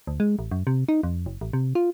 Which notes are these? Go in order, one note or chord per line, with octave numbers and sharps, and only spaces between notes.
D2
G#3
A1
F#2
C3
D#4
F2
F#1
A1
C3
F4